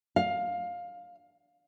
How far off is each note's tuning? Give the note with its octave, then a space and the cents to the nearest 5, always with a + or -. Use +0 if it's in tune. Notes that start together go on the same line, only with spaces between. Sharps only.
F5 +15